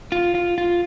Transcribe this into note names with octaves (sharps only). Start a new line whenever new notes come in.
F4
F4
F4